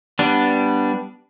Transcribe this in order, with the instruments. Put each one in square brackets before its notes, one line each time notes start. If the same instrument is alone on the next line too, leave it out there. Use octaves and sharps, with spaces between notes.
[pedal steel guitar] G3 B3 D4